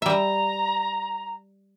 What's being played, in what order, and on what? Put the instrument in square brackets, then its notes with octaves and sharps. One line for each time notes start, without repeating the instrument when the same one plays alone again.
[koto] G3 E5 [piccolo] A#5